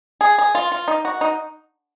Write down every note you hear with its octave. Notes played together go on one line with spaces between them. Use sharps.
G#4
G#4
F4
F4
D#4
F#4
D#4